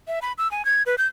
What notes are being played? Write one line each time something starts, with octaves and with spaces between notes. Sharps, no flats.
E5
B5
E6
G#5
G#6
B4
G6